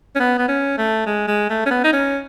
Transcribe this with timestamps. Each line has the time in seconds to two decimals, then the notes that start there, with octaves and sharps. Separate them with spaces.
0.15 C#4
0.20 B3
0.38 B3
0.48 C#4
0.78 A3
1.06 G#3
1.28 G#3
1.50 A3
1.66 C#4
1.70 B3
1.84 D#4
1.93 C#4